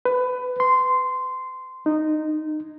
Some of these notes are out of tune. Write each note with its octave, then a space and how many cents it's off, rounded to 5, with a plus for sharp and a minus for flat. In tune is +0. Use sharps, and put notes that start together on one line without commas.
B4 +20
C6 -15
D#4 -15